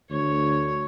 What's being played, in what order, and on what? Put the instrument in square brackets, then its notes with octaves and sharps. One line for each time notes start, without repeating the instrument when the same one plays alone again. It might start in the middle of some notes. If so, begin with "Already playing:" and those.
[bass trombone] D2 [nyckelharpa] C#5